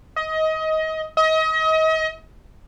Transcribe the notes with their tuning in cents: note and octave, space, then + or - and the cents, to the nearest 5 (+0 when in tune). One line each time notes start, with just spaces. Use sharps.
D#5 +25
D#5 +35